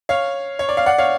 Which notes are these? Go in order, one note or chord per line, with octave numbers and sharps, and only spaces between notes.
C#5 F5
C#5
D5
F5
D5 F#5
C#5 F5